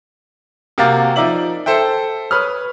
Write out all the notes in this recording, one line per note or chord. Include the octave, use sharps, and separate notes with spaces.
C3 A#3 F#4 G4 F5 A6
F3 D#4 A#4 D5 E5 F#7
A4 C5 E5 G5
B4 C#5 D#6 F6